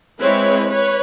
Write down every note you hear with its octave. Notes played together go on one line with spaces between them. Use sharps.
G#3 C4 E4 B4 C#5
B4 C#5